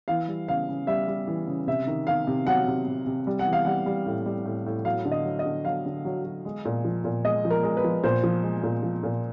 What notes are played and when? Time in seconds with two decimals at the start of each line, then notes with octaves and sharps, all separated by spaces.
0.08 E3 F5
0.28 G3
0.48 C#3 F5
0.68 C#3
0.87 G3 E5
1.07 G3
1.27 E3
1.47 C#3
1.67 C3 E5
1.87 D#3
2.07 D#3 F5
2.27 C3
2.47 F#3 F#5
2.67 C3
2.87 C3
3.06 C3
3.27 G3
3.39 F#5
3.46 E3
3.53 F5
3.65 G3 F#5
3.86 G3
4.06 A2
4.26 G3
4.45 A2
4.66 A2
4.85 F#3 F5
5.05 D3
5.12 D#5
5.25 F#3
5.39 D#5
5.45 D3
5.65 F#3 F5
5.86 D3
6.05 F#3
6.24 F#3
6.45 G#3
6.65 A#2
6.84 F3
7.04 A#2
7.25 G#3 D#5
7.45 F3
7.51 A#4
7.63 G#3
7.77 B4
7.84 F3
8.04 A#2 C5
8.23 F3
8.43 G#3
8.63 A#2
8.83 F3
9.03 A#2